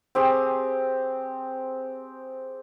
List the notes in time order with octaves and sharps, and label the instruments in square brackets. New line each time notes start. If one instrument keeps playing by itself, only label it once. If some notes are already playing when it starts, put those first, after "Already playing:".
[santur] C4 G4 G#4